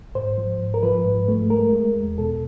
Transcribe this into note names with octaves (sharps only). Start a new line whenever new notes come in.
G#2 C5
F3
G#2
A#4
F3 B4
G#2
A3
G#3 A#4
G#3
E2
B2 A4